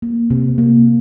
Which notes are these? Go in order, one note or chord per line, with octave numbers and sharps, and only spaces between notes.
A#3
C3
A#3